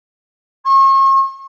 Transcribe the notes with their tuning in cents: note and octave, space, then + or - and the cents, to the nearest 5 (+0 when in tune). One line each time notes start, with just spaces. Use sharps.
C#6 -40